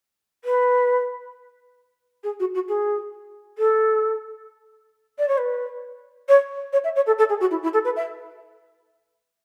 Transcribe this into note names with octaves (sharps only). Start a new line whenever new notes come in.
B4
G#4
F#4
F#4
G#4
A4
D5
C#5
B4
C#5
C#5
E5
C#5
A4
A4
G#4
F#4
E4
E4
A4
B4
E5